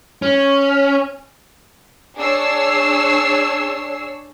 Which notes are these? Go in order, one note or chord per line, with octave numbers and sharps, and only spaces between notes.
C#4
D4 G#4 C#5 E6 C7